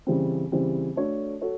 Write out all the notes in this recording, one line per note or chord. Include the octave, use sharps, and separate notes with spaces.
C#3 E3 G3 C4
C#3 E3 G3 C4
A3 D4 F#4 A4 C#5
F#4 A4 C#5